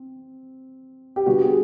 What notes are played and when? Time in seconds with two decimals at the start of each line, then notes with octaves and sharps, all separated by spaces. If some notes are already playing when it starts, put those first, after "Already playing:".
Already playing: C4
1.16 G4
1.26 D3 G3 B3 F#4
1.42 G#4